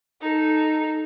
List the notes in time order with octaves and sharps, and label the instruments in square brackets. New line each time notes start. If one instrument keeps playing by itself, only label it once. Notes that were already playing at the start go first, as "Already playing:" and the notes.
[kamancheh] D#4 A4